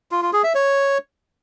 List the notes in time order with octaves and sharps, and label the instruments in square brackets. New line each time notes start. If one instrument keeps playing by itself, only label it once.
[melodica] F4
F4
G#4
E5
C#5